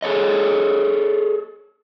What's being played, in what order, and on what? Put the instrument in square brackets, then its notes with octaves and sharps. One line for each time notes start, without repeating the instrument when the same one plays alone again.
[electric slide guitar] G#4 A4 C#5 D#5